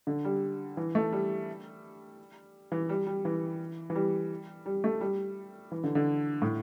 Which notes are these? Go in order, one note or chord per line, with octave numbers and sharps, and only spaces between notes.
D3
G3
E3
A3
G3
E3
G3
G3
E3
E3
G3
G3
A3
G3
E3
D3
D3
A2